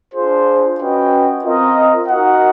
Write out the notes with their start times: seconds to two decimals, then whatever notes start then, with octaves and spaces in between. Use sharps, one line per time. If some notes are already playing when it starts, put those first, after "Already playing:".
0.13 D4 F4 G#4 C5
0.79 C#4 F#4 B4 D#5 G5
1.44 C4 F4 A#4 D#5
2.08 D#4 F#4 A#4 D#5 F#5